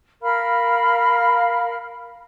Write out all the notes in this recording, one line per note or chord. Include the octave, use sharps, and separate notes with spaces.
A#4 F5 B5 F6